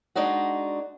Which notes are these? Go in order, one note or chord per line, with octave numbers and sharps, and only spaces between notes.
G#3 D4 D#4 F#4 F#5